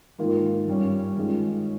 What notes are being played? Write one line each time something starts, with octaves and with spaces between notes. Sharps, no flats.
G#2 D#3 A#3 F4
G2 G3 C#4
D#3 G#3 C#4 F4 G#4